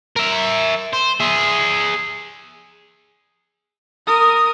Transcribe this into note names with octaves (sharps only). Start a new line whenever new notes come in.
A#4 E5
C5
G#4 E5
A#4 D#6